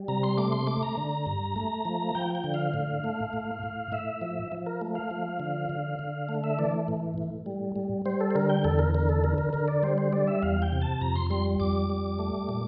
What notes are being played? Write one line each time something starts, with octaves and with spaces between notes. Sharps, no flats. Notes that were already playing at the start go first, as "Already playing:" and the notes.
Already playing: G3
C3 A#5
C6
A3 D6
C6
A3 D6
A#5
D3
G2
A3
F3
F3 G5
G5
D3
F5
A2
A3
A2
A2
A2 E5
F3
F3
A#4
A3
F5
F3
D3
D3
D3
A3
E5
E3 D5
A2
A2
G3
G3
G3 C5
A4
C5
D3 A#4
G5
E2 A4
A#4
D3 A#4
A4
D3 A#4
A#4
D3 A#4
D5
G3 C5
C5
G3 D5
E5
E2 F5
G5
C3
A5
F2 A#5
C6
G3 C6
F2 D6
G3
A3
A#2